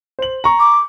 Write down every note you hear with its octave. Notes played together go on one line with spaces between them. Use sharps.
C5 F#7
A#5 C#6
D6